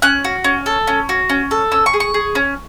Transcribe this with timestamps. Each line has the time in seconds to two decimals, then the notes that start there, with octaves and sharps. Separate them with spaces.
0.02 C#4 F#6
0.24 F#4
0.44 C#4
0.66 A4
0.87 C#4
1.09 F#4
1.29 C#4
1.51 A4
1.72 C#4 E6
1.86 C#6
1.93 G#4
2.00 C#6
2.14 G#4
2.35 C#4